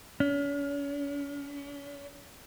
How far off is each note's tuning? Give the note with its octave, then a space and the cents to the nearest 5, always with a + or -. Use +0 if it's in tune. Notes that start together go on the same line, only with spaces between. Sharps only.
C#4 +40